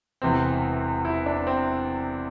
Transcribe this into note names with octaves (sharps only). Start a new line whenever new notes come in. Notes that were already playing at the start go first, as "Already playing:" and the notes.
E1 E2 C3 E3 C4
E4
D4
C4